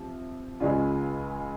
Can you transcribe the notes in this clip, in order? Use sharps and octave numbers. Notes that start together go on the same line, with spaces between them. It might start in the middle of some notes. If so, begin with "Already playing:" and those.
Already playing: C3 F3
C#2 C#3 G#3 C#4 F4